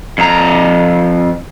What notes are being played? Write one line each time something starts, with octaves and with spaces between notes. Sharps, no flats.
F2 A#5